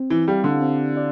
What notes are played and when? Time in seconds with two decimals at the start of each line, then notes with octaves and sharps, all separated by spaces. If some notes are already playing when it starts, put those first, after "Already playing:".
Already playing: C4
0.10 E3
0.27 G3 E4 G4 D5 F5
0.44 D3
0.61 C4
0.95 E4 G4 D5